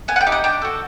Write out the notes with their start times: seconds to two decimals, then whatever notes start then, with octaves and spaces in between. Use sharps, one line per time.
0.08 B3 G#5
0.16 F#5
0.21 G5
0.27 D#4 G4
0.32 F#5
0.44 D4 G5
0.62 F#4 A4